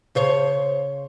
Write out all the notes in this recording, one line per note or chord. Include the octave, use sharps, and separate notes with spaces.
C#3 C5 C#5